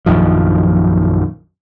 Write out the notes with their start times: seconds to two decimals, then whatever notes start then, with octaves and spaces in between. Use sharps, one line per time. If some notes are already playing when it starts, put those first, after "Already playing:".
0.06 A#1 F#2 D#3 F3